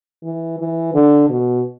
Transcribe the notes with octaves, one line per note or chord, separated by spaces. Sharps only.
E3
E3
D3
B2